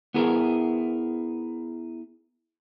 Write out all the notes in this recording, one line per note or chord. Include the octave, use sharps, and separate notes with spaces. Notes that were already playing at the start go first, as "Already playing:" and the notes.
B3 E4 G#4 A#4